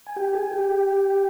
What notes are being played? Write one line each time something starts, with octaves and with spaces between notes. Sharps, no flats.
G#5
G4 G5
G#4 G#5
G4 G5